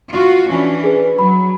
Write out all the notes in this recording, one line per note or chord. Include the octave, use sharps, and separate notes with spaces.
F4 F#4
E3 C#4 D4
G#4 B4
F#3 B5